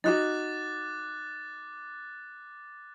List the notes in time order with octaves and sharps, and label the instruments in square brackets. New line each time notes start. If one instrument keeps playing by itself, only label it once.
[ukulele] D#4 F4 F#4 [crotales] D6 F#6 A6